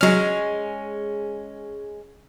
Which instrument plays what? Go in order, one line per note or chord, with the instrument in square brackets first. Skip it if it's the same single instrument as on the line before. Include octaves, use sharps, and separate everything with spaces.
[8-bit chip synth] F#3 F6 [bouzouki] G#3 C#4